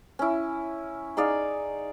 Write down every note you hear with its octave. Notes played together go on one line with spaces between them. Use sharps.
C#4 E4
D#4 G#4 D5 F5